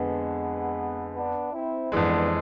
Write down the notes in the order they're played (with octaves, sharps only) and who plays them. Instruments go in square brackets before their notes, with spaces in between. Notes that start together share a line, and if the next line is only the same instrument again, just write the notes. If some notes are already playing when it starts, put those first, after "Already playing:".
Already playing: [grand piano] F2 D3 [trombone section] G#3 B3
[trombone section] B3 D4
C4 E4
[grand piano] F2 E3 G#3 [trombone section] B3 D4